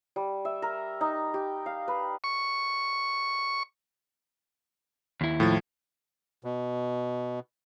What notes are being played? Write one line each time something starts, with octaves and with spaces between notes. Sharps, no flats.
G3
E5
A#4
D#4
G4
F5
B4
C#6
D#2 E4
A2 F3 A6
B2